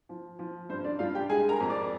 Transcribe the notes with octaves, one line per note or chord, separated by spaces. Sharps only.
F3
F3
G2 C5
D4 D5
G2 F4 F5
G4 G5
G#3 G#4 G#5
A#4 A#5
F2
D5 D6